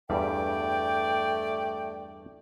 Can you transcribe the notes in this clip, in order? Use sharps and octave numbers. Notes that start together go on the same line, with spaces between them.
E2 G2 G3 A3 D5 G5